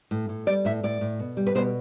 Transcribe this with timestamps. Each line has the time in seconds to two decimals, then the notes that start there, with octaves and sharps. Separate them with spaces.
0.11 A2
0.29 A2
0.47 G3 D5
0.65 A2 E5
0.83 A2 D5
1.01 A2
1.19 B2
1.37 G3
1.47 B4
1.55 B2 C5